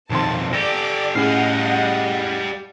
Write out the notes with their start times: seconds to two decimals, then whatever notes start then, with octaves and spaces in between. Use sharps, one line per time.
0.11 B1 F2 D#3 C4 A5 C6
0.53 G4 A4 D5 D6 A#6
1.15 A2 G3 C#4 G#4 D#5 F5 F#5